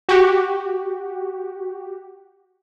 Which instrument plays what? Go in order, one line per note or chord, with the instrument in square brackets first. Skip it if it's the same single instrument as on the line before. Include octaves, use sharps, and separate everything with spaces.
[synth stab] F#4 G4